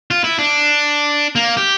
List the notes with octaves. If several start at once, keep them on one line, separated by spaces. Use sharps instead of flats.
F4
E4
D4
A#3
G4